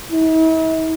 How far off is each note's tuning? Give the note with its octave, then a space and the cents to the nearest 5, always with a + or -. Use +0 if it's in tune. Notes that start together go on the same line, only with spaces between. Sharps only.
E4 -45